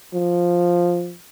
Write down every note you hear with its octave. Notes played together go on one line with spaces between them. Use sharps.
F3